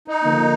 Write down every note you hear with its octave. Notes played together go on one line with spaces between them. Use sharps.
D#4
D3 F3 A#3